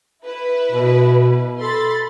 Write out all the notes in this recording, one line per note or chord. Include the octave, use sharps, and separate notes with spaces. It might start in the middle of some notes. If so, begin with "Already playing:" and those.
E4 B4
B2
A4 B5 C6 A6